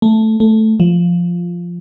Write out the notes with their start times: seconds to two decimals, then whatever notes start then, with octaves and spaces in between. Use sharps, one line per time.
0.02 A3
0.40 A3
0.80 F3